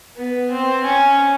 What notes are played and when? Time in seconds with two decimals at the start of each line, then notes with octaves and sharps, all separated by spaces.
0.17 B3
0.51 C4
0.85 C#4